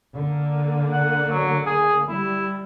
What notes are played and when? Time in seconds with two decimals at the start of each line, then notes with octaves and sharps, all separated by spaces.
0.16 D3 A#3
0.93 F#5
1.31 F#3
1.66 G#4
2.09 G3 E4